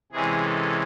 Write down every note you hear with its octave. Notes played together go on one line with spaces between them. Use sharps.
C3 E3 G#3 C#4 G#4
A4